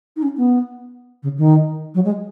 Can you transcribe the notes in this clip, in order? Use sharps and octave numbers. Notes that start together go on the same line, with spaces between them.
D#4
C#4
B3
C#3
D#3
F#3
G#3